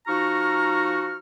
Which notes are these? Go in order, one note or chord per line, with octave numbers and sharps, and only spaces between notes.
F3 D#4 F#4 A#5 C#6 F6